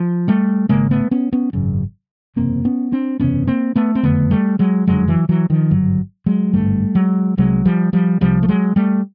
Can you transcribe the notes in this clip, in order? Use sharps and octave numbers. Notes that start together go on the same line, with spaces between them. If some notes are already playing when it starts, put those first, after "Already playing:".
Already playing: F3
G3 A3
G#1 F#2 C#3 G#3 A#3
A3 B3
B3 C#4
B3 C#4
G#1 F#2 C#3
F#1 E2 C3 A#3 C4
B3 C#4
C4 D4
F#1 E2 C3 B3 C#4
A#3 C4
A3 B3
C4
F#1 F2 D3 A3 B3
G3 A3
F#3 G#3
F#1 F2 D3 F#3 G#3
E3 F#3
E3 F#3
D#3 F3
G#1 G2 D3 F#3
F#3 G#3
G#1 G2 D3 G3 A3
F#3 G#3
C2 C3 F#3 G#3
F3 G3
F3 G3
C2 C3 F3 G3
A3
F#3 G#3
G3 A3